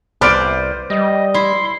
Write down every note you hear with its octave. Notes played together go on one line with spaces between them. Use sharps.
C2 B4 C5 D5 D6 F6 D7
G3 D#5
E4 C6